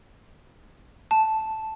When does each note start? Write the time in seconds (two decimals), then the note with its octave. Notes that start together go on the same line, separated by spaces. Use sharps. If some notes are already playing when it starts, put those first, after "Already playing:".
1.11 A5